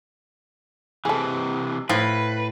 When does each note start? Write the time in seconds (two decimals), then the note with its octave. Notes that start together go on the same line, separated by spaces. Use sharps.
1.05 C3 E3 G#4 A4
1.89 A2 F3 B4